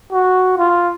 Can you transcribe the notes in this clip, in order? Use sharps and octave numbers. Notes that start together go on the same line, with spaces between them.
F#4
F4